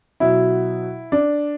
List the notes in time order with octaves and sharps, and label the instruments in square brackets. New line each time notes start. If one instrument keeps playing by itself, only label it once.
[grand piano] B2 F#3 E4
D4